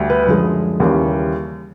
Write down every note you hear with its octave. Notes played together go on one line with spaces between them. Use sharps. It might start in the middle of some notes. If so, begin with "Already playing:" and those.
Already playing: D2 G3
B4
F#2 D3 F3 G#3
D#2 C#3 E3 G3